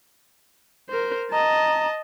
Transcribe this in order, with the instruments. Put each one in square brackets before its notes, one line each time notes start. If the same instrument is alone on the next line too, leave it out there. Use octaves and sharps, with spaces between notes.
[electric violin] A#4 C5
[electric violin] D#5 A5 [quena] A#5